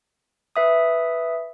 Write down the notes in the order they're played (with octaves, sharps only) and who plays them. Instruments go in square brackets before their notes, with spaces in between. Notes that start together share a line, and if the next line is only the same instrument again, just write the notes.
[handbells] B4 E5 D#6